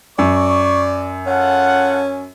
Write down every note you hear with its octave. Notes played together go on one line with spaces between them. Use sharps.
F#2 D5 C#6
C#4 F4 A4 F#5